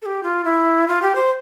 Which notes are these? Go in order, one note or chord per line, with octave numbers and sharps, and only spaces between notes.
A4
G4
F4
E4
F4
G4
C5